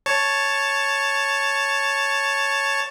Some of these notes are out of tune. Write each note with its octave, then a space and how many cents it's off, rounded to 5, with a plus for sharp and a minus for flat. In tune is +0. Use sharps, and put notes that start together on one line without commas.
C#5 +0 A5 +0